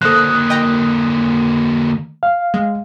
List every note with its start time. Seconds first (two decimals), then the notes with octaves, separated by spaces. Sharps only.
0.02 D3 A#3 A4 C5 D#6 F#6
0.50 D#5 G5 A#5
2.23 F5
2.54 G#3